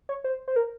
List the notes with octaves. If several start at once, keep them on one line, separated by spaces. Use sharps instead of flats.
C#5
C5
C5
A#4